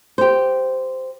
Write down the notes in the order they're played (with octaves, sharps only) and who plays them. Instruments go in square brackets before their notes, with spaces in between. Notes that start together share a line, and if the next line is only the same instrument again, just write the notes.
[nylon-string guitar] G4 C5